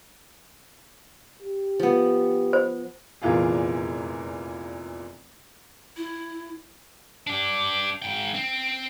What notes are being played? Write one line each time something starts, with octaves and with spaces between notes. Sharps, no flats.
G4
F3 B3
C5
F1 E2 A#2 E3 F4 G#4
E4
D4 G4
G#2 G5
C4